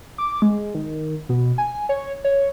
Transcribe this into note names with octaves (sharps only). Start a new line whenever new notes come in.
D6
G#3
D#3
B2
G#5
C#5
C#5